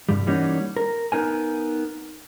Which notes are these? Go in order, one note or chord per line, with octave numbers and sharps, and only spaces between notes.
C2 G2 G3
E3 G3 A#3 C#4 D#4 F#4
A#4
B3 D#4 A#4 G#5